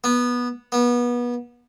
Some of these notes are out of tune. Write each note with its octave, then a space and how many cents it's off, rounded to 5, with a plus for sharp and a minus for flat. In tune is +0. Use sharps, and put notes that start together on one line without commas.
B3 -15
B3 -30